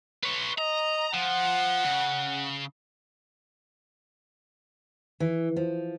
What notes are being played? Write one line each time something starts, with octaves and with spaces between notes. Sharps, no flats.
B4 C#5
D#5 A#5
F3 F#5
C#3
E3
F3